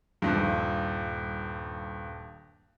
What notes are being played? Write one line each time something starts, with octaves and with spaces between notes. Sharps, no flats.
D#1 G2